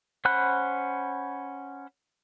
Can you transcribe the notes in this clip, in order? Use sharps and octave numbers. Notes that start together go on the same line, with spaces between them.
C#4 C5 F#5 B5 F#6